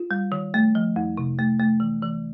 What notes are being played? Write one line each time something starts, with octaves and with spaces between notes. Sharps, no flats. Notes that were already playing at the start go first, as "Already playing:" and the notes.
Already playing: F4
G3
D#3
A3
F3
F2
C3
A3
A3
E3
E3